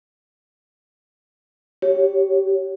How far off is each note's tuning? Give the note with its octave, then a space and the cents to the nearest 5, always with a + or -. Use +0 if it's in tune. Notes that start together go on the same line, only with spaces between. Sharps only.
G4 -20 C#5 +0